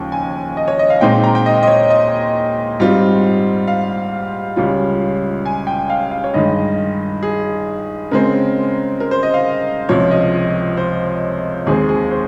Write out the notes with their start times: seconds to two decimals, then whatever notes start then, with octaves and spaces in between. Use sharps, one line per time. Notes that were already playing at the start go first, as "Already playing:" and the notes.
Already playing: D#2 C#3 F3 G#3 G5
0.12 G#5
0.57 D#5
0.68 C#5
0.79 D#5
0.90 F5
1.01 A#2 G#3 C4 D#4 G5
1.23 A#5
1.35 G5
1.46 D#5
1.63 D#5
1.68 C#5
1.90 D#5
2.79 G#2 G3 C4 F4
3.67 F5
4.56 C#2 C#3 G3 C#4 F4
5.46 G#5
5.67 G5
5.90 F5
6.11 F5
6.24 C#5
6.34 G2 D#3 G#3 D#5
7.23 G#4
8.11 C#3 G#3 C4 A#4
9.00 A#4
9.11 C5
9.23 D#5
9.34 F5
9.89 C#2 C3 F3 C4 C#5
10.11 D#5
10.77 C5
11.66 D#2 D#3 G#3 C4 G#4
11.89 G#4
12.11 C5